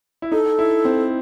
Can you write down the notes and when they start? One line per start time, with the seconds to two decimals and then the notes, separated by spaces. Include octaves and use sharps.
0.22 E4
0.32 D#4 A4
0.59 E4
0.85 C4